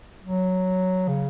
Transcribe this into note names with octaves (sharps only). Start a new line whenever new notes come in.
F#3
C#3